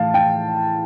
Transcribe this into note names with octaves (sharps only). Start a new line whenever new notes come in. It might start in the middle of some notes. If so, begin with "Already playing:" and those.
Already playing: A2 E3 F5 A5
G5